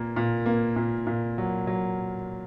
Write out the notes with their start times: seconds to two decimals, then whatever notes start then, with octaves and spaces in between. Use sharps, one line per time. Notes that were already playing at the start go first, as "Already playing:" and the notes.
Already playing: A#2 A#3
0.16 A#2
0.46 A#3
0.76 A#2
1.07 A#2
1.38 F#3
1.67 F#3